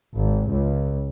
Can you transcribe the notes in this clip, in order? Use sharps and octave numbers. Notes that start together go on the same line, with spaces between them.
G#1
C#2